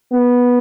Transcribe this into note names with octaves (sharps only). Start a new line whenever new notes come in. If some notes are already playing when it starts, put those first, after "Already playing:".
B3